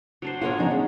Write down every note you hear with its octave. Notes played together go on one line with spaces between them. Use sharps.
F#3 D4 C5
G#3 B3 F4 A#4 C5 C#5
C#3 F3 D#4
C#4 G#4